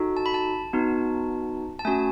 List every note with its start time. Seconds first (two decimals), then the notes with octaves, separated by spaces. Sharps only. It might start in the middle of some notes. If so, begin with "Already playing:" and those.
Already playing: D#4 F#4 A4
0.17 A5
0.26 B5
0.34 A5
0.73 B3 D#4 F#4
1.79 A5
1.85 A3 C#4 F#4 G#5